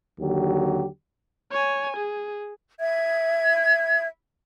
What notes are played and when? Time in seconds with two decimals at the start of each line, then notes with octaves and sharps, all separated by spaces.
0.20 D#2 D3 F#3 G4
1.51 C#5 G#5
1.96 G#4
2.80 E5 G#6